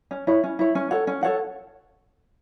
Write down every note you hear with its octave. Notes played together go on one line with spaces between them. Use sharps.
C#4
E4 C#5
C#4
E4 C#5
C#4
A4 C#5 F#5
C#4
A4 C#5 F#5